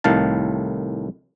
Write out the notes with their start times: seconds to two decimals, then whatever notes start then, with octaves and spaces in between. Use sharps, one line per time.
0.04 C2 A2 D#3 F5 A5